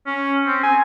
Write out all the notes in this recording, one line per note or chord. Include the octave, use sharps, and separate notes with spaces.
C#4
C4
G#5